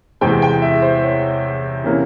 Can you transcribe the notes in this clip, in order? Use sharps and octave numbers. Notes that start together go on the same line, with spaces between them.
E2 C3 E3 G#3 C4 G5
G5
E5
C5
C#5
C3 E3 A#3 C#4